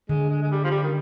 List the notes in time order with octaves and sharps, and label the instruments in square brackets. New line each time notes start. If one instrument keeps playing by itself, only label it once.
[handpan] D3 [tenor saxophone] G#3
[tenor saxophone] G#3
G#3
G3
F3
G3
D#3